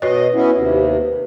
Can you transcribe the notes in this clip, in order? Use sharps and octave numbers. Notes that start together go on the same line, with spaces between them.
B2 F#4 B4 C#5 D#5
B3 C#4 E4
D#2 C3